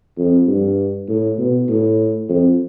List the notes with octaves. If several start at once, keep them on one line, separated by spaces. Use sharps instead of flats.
F2
G2
A2
B2
A2
F2